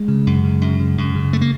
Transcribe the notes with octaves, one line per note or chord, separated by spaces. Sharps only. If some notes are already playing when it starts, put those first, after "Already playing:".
Already playing: G#3
C#3
F#2
C#3
F#2
C#3
F#2
C#3
A3
A#3